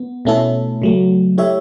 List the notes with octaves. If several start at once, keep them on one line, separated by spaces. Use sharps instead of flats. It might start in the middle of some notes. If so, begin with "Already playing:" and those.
Already playing: B3
B2 A3 C#4 E4 A4
C#3 F#3 A3
A3 E4 G4 C#5 E5